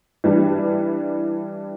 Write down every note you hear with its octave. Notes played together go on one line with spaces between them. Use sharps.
E3 G3 D4